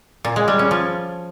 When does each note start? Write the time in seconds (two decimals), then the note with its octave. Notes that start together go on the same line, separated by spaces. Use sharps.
0.25 A#2
0.36 G#3
0.48 G3
0.59 C#4
0.71 F3